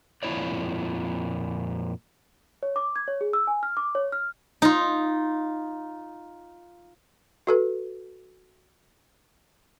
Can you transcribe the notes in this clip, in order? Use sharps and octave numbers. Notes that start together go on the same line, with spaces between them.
F2 A#2 G#3 E4 C#5 D5
C#5
D6
G#6
C#5
G#4
E6
G#5
F6
D6
C#5
F6
D#4 F4
F#4 A4 B4